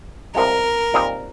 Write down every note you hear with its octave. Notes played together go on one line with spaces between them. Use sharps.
C2 C3 F3 G#3 A#4
A#2 G3 C4 D#4